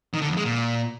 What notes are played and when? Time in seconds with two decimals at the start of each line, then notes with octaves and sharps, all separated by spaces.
0.14 D#3
0.22 D3
0.29 F2
0.37 G#3
0.45 A#2